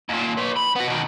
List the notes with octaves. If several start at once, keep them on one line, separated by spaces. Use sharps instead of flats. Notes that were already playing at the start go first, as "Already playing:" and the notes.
D#2 A#2
B4 C#5
B5
B3 F#4
B2 D#3